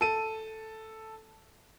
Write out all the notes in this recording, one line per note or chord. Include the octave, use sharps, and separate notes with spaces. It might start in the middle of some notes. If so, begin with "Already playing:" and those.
A4 D#7